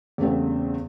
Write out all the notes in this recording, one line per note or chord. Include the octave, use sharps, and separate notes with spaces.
E2 C#3 G3 A3 B3 C4